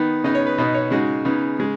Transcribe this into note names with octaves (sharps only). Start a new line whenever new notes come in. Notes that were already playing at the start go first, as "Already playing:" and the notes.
Already playing: D#3 B3 D#4
C#3 B3 D#4 D#5
C#5
B4
B2 B3 D#4 D#5
C#5
C#3 G#3 D#4 F#4
C#3 B3 D#4 G#4
C#3 G#3